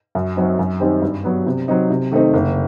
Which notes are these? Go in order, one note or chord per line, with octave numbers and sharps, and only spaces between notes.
F#2
F#3 C4 D#4
F#2
D#3 G3 C4 D#4
G2
F#3 B3
C3
F#3 C4 D#4
C3
D#3 A3 C4 D#4
F#1